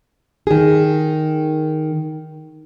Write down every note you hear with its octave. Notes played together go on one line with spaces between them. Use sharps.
D#3 G#4